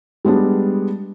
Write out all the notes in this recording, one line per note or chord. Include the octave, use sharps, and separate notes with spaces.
G3 G#3 B3 D4